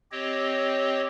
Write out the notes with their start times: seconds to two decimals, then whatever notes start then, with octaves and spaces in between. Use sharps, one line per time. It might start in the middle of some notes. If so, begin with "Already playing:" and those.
0.12 C4 G4 C#5 D#5